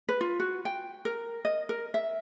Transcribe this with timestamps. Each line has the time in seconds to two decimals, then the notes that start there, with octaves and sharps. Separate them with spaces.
0.09 B4
0.21 F4
0.40 F#4
0.65 G5
1.05 A#4
1.45 D#5
1.69 A#4
1.94 E5